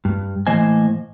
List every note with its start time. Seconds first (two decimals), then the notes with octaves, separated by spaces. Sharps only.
0.05 G2
0.47 A2 E3 A#3 C5 D#5 G#5